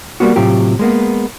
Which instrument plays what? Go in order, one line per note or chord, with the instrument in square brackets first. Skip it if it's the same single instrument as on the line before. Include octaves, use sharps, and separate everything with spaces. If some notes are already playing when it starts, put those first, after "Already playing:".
[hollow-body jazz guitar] G3 A#3 B3 F#4
A2 C3 F#3 F4 G4
G#3 A#3 B3